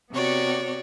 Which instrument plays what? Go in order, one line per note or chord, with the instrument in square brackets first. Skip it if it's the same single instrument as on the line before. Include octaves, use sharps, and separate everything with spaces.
[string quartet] C3 B3 F#4 C#5 D5